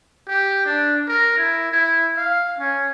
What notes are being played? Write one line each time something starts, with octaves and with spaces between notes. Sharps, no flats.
G4
D4
A#4
E4
E4
F5
C#4